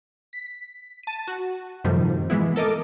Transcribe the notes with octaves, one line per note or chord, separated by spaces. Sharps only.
B6
A5 D#7
F#4
F#2 A2 C3 D#3 F3 G3
E3 G#3 B3 E4
A4 A#4 D#5 D6